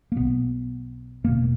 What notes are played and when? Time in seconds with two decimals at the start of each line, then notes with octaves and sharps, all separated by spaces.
0.12 A#3
0.16 B1 B2 B3
1.24 E1 E2 B2 A#3